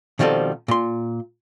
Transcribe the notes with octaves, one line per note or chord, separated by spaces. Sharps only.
B2 D#3 F3 G3 C4 A4
A#2 C6